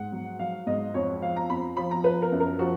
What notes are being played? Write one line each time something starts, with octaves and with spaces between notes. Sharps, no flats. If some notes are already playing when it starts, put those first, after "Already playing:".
Already playing: G#2 F#5
F#3
F#3 F5
G#2 D#5
F2 C#5
F3 F5
A#5
F2 B5
F3 B5
A#5
F3 B4
A#4
F#2
A#4
F3 F#4